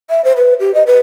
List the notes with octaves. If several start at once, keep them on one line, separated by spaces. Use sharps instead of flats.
E5
C5
B4
G4
D#5
B4